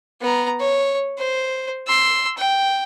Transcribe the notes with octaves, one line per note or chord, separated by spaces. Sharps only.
B3 A#5
C#5
C5
C6 E6
G5